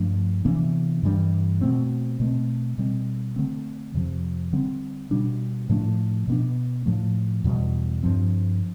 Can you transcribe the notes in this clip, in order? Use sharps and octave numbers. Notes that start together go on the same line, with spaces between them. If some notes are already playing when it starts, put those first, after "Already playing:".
Already playing: G2 F3 A3 D4
C3 E3 B3 D4
G2 E3 G3 D4
B2 A3 C4
B2 A3 C4
B2 G3 C4
D3 A3 C4
F2 C3 F3
D3 G3 C4
B2 G3 D4
A2 F3 A3 D4
B2 B3 D4
A2 F3 A3
E2 B2 G3
G2 F3 C4